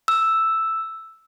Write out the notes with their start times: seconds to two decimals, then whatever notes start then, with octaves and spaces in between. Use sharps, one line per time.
0.08 E6